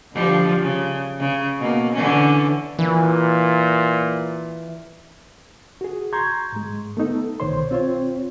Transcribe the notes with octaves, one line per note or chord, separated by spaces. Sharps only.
D3 F3 G3
C#3
C#3
B2 A#3
D3 E3 C#4
A#2 E3
F#4 G#4
A#5 C6 C#6 G6 G#6
G#2 G#3
A3 B3 D#4 A4
C2 B2 D#3 C5 C#5 C6
C4 F4 C5 C#5